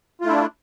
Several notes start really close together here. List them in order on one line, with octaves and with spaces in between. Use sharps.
F4 A3 E4 D4